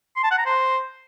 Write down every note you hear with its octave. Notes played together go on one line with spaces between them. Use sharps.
C6
A5
F#5
A#5
C5